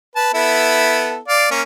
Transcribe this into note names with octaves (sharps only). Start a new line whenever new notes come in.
B4 A5
B3 E4 A4
D5 F5
A#3 C#4